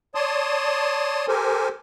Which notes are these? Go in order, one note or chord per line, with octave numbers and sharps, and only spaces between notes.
C#5 D5 A5 C6 D#6
G4 A4 A#4 C5 G#5